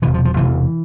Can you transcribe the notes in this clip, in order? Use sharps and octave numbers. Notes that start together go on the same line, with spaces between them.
E1 D2 C3 E3
F3
F3
E1 D2 C3 E3